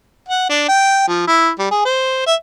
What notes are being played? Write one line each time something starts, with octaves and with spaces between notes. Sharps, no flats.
F#5
D4
G5
F3
E4
G3
G#4
C5
E5